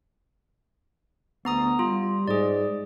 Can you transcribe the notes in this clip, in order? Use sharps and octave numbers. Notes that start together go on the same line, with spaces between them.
D2 B3 A#5 D#6
G3 F4
G#2 G#4 D5